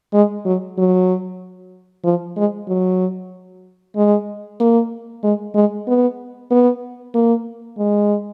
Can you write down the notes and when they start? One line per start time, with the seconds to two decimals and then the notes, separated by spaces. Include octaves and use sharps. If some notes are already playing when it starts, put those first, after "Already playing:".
0.14 G#3
0.46 F#3
0.78 F#3
2.04 F3
2.37 G#3
2.68 F#3
3.96 G#3
4.60 A#3
5.24 G#3
5.55 G#3
5.88 B3
6.51 B3
7.15 A#3
7.78 G#3